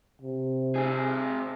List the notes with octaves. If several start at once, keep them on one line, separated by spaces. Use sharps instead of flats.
C3
C4 G#4